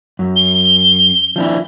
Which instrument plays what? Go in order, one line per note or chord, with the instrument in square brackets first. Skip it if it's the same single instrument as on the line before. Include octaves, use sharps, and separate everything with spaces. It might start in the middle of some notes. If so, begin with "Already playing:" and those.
[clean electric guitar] F#2
[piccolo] G7
[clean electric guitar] F3 D4 E4